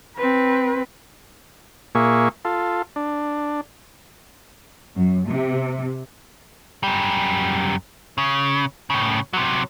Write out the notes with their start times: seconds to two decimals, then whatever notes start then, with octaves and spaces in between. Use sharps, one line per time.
0.17 C4 B4
1.95 A#2 A#3 G#4 E5 C#6
2.45 F4 A4
2.96 D4
4.95 F#2
5.26 C3
6.83 F#2 G3
8.18 C#3
8.90 A2 C#3
9.33 C3 F#3